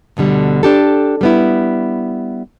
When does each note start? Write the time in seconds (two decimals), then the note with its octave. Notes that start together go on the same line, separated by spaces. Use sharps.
0.17 D2 B2 D3 G3
0.63 D4 G4 A4
1.21 G3 B3 E4